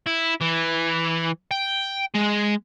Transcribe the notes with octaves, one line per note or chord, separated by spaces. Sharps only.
E4
E3
G5
G#3